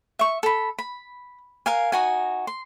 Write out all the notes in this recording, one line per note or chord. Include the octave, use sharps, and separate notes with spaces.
E5 C#6
A4 B5
B5
A#4 F5 G#5
D#4 F#4 G#5
C6